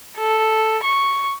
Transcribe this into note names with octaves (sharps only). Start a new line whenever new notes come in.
A4
C#6